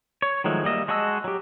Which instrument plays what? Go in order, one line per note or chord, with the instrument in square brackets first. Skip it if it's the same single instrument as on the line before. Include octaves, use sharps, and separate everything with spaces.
[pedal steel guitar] C#5
D#3 F3 F#3 G#3 A3
G3 A#3 D#5 E5
G#3 F#4 D#5 A5 E6
F#3 G4